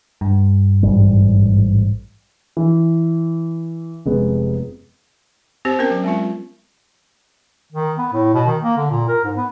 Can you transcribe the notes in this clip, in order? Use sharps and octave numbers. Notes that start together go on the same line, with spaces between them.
G2
A1 G#2 G3
E3
F1 G#3 B3
C4 G4 C5
B3 C#4 A#4
F#3
G#3 C4 F4
D#3
B3
A2
B2
D#3
A#3
D3
A#2
A#4
G#2
B3